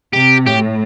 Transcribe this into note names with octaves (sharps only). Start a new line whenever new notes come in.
C3 G4
A2 G4